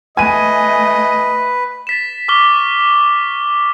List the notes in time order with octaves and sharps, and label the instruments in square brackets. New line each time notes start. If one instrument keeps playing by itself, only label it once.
[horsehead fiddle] A3 [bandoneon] B4 [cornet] D#5 [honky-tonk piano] G#5 D#7
[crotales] A6 B6 E7
C#6 D6 F6 G7
E7